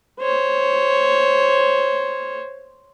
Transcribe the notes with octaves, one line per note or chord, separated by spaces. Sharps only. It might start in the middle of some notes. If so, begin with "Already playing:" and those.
C5 C#5